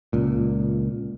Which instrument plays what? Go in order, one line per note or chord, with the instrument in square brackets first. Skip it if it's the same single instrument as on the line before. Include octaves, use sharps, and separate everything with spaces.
[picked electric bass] C#2 A#2